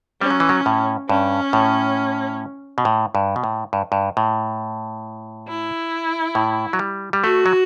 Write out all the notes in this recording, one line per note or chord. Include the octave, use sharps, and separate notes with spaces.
G3 C#4
F#3
E3
F#3
A2
G2 C#4
A2
B2
A2
G2
B2
A2
G2
G2
A2
E4
A2
F#3
G3
G3
A3 F#4
F#3